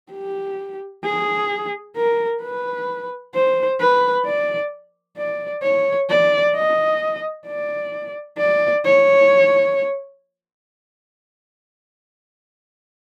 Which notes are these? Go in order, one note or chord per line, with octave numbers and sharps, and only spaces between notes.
G4
G#4
A#4
B4
C5
B4
D5
D5
C#5
D5
D#5
D5
D5
C#5